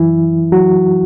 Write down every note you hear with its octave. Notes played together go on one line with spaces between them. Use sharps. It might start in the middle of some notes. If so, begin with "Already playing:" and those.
Already playing: F#2 E3 F#3 E4
F#3 F#4